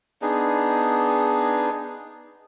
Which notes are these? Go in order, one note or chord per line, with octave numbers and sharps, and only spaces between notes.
B3 D4 D#4 G#4